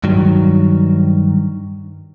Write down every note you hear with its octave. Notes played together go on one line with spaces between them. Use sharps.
G2 D#3 F#3